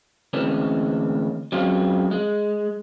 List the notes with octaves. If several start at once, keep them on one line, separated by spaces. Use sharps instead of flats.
D2 E3 G#3 C4 C#4
F#3 G#3 C4 C#4 F4
G#3